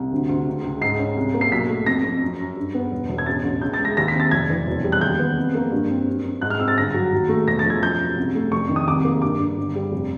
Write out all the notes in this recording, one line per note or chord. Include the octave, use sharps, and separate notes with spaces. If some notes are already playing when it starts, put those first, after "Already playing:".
Already playing: C2
D2
D2
C#2
C#2
G#2 C7
C#4
C2
A#3
C7
B1 B6
A3
F2 A#6
F2
F#2
F#2
G2
B3
E1
E1
G#6
A1 A6
A1
C#2 G6
A6
G#3
A#6
D#2 A#6
B6
C4 A6
F1 G#6
E3
E1
G3
F#6
D#2 G6
B3
F2
A#3
G2
C4
F#2
F#2
G#2 F#6
F6
C4 E6
A6
G1 A#6
F#3
D#2
A3
E1 A#6
A6
F3
G#6
F#2 G6
F#2
C2
A3
F1 C#6
D#3
D#6
C2 D6
A#3
G2 D6
G2
G1
G3
F1